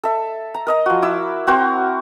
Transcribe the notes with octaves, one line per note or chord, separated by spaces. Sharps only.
A4 E5
A#5
A#4 D#5 A#5
F3 F#4
E4 D6 E6
C4 F#4 A#4 C5